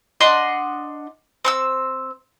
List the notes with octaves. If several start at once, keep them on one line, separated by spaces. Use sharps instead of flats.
D4 D#5 F#5 C6
C4 C#6 E6